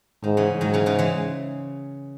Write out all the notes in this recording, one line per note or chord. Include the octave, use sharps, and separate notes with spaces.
G#2 D#3
C#3 E3
G#2 D#3 F#3
C#3 E3
C#3 E3
E3 G#3